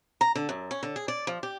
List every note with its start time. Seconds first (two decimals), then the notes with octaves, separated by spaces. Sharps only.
0.21 A#5
0.35 D3
0.49 F#2
0.71 C#4
0.83 D3
0.96 G#4
1.08 D5
1.27 F3
1.43 G4